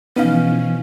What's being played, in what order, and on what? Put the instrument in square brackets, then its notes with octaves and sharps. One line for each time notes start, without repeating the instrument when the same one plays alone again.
[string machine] B2 E3 F3 [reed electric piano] B3 D#4 F5 [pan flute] C#4